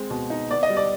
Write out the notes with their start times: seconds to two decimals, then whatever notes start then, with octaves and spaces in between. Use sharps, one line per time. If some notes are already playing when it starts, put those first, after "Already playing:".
Already playing: G#3 C4
0.10 B2
0.30 D#4
0.50 B3 D5
0.63 D#5
0.70 G3
0.77 D5